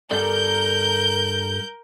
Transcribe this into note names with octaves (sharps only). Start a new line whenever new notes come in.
G2 A4 A#4 D5 G6